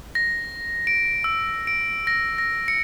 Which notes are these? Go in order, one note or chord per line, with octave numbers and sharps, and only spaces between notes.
A#6
D7
E6
D7
A#6
A#6
C#7